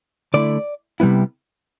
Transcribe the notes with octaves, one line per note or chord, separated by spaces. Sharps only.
D3 A3 E4 D5
C3 G3 B3 E4